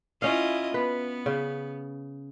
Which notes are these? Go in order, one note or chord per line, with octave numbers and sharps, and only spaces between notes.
C#4 E4 F4 D#5 F5
B3 B4
C#3